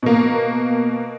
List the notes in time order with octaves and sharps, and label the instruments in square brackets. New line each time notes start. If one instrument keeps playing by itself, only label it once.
[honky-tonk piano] B2 A#3